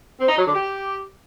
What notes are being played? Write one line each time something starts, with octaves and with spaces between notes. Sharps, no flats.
C4
D#4
F#3
D3
G4